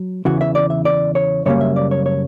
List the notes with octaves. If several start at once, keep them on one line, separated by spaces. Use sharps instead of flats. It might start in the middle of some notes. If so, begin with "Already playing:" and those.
Already playing: F#3
E2 C#3 E3 F#4
E5
D5
E5
D5
C#5
F#2 C#3 G3 A#3 C#4 C#5
E5
D5
C#5
C#5